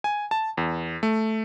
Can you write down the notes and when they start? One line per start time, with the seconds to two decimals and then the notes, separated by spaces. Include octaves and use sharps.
0.04 G#5
0.31 A5
0.57 E2
1.03 A3